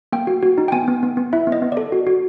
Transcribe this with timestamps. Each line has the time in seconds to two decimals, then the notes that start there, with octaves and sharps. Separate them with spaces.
0.12 A#3 G5
0.27 F#4
0.43 F#4
0.58 D#4
0.68 G5
0.72 B3 G#5
0.88 B3
1.03 B3
1.17 B3
1.33 E4 E5
1.47 B3
1.52 D#5
1.62 B3
1.72 A4 D5
1.92 F#4
2.07 F#4